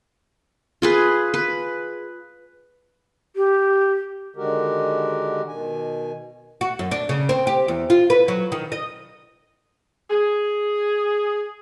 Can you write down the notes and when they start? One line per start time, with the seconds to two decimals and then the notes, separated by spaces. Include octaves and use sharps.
0.82 F4 G#4 B4
1.34 B4
3.36 G4
4.36 D3 D#3 G#3 F#4 G4 A#4
5.48 B2 D#3 G#5
6.61 F#4
6.79 F#2
6.91 D4
7.09 C#3
7.29 C4
7.47 G4
7.68 E2
7.90 F4
8.10 B4
8.28 F#3
8.52 D#3
8.72 D#5
10.10 G#4